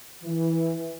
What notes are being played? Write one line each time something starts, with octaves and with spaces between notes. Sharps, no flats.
E3